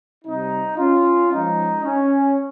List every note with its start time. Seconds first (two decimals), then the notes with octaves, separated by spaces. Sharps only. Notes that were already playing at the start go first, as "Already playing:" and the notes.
0.25 C3 G3 C4 D#4
0.78 C#4 F4
1.31 F3 G#3 C#4 D#4
1.84 C#4